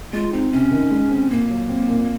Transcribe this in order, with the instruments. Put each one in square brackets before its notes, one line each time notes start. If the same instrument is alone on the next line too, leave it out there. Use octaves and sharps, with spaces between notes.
[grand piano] G#3 [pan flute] F4
[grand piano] C4 [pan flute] D#4
[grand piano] C3 [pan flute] C#4
[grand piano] D#3
G#3
C4
[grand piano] A#2 [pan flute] A#3
[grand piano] F#3
C4
A#2